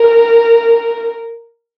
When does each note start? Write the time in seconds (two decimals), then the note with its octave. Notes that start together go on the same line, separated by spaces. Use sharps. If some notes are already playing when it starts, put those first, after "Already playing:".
Already playing: A#4